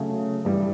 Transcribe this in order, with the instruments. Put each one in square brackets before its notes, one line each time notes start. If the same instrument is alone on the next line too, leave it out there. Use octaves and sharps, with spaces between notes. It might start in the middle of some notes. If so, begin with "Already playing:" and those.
Already playing: [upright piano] C#3 F#3 A3 C#4
G2 E3 G3